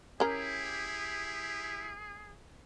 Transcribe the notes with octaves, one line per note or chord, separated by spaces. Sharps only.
C#4 E4 G4 G#4 A#4